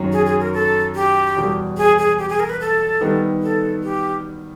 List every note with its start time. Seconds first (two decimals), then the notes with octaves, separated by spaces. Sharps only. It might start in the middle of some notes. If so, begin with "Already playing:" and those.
Already playing: F#2 D#3 F#3
0.12 G#4
0.26 G#4
0.40 A#4
0.54 A4
0.95 G4
1.37 E2 B2 G3
1.78 G#4
1.99 G#4
2.19 G4
2.29 G#4
2.40 A#4
2.49 B4
2.60 A4
3.01 D#3 G3 B3 D#4
3.42 A4
3.83 G4